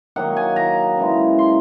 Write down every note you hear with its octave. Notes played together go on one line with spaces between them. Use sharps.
D#3 F#3 A#3 F#5
G#5
A#5
C#3 E3 G#3
C6